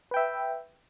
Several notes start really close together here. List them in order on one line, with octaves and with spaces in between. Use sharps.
B4 G5 E5